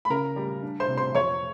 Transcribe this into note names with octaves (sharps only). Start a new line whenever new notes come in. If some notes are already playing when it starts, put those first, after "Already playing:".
B5
C#3 A#4 A#5
G3
D4
C5 C6
C3
C5 C6
F2 C#5 C#6